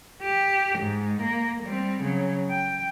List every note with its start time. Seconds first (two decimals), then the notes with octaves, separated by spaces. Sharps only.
0.22 G4
0.79 G#2
1.22 A#3
1.63 G3 C4
2.01 C#3 F#3
2.50 G5